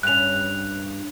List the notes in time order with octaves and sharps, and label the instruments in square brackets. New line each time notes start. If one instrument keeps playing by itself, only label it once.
[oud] G2 C#4 [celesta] F#6 F7